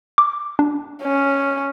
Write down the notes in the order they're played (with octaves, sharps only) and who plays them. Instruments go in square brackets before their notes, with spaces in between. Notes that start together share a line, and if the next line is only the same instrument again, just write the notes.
[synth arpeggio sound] D6
D4
[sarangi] C#4